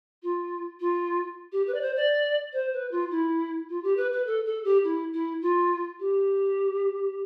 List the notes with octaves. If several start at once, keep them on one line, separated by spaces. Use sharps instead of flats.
F4
F4
G4
B4
D5
C5
D5
C5
B4
F4
E4
F4
G4
B4
B4
A4
A4
G4
E4
E4
F4
G4